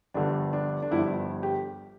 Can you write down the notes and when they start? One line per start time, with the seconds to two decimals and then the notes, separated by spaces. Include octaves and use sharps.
0.14 G1 G2 D3 F3 D4
0.53 D4
0.82 D4
0.91 G1 G2 D3 F3 E4
1.43 G4